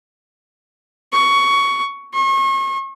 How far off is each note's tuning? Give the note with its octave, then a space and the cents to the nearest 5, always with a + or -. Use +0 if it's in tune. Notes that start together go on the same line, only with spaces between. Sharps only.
C#6 +15
C#6 -40